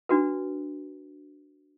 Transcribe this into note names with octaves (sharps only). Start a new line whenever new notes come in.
D4 F#4 B4